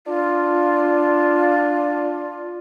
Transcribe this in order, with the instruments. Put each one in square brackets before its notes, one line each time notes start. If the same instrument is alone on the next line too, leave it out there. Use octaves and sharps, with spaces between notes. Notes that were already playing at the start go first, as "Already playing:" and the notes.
[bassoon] D4 [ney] F4